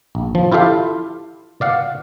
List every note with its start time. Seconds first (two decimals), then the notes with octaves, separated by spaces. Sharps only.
0.15 A#1
0.35 F3
0.52 E4 F4 G4 A4 E5 F5
1.61 D5 F5 F#5